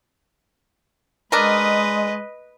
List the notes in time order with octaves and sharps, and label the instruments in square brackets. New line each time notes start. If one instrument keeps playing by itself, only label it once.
[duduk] G#3 [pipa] D4 A#4 [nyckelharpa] B4 D#5